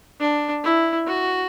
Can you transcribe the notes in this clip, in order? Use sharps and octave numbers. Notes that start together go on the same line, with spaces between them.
D4
E4
F#4